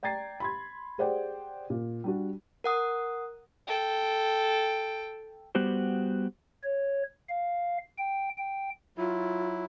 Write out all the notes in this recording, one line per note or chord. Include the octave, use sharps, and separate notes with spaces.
D5 G5 A#5 G#6 A6 C7
B5 C6 G#6
G4 G#4 C5 D5 F#5 G5
A#2
G3 D4 F#4
A#4 F#5 D#6
A4 G5
G3 B3 F#4 G4 C5
C#5
F5
G5
G5
F#3 E4 F4